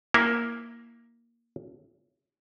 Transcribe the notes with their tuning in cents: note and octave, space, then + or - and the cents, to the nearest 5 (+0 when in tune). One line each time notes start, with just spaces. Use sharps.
A#3 +5 E4 +0